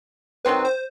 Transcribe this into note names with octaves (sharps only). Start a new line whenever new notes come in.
D#3 F#3 C4 B4
C5